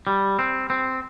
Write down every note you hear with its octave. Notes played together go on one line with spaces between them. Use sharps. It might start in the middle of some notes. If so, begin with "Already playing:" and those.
G3
C4
C4